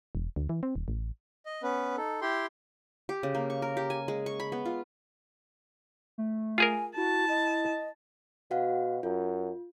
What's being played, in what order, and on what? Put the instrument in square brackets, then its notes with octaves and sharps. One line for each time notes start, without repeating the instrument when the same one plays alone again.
[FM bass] E1
D2
E3
C4
D#1
A1
[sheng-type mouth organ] D#5
B3 C#4 B4
D#4 A4
E4 G4 G5 C6
[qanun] G4
C#3
A#3
C#6
A#4
G4
G#5
G#3
C#6
B5
B3
F4
[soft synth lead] A3
[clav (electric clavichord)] F4 G#4 A#4 [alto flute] G#5
[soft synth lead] E4 [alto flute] F#4 [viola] A5
[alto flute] D#5
[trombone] B2 [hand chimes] F#4 F5 F#5
[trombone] F#2 [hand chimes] F4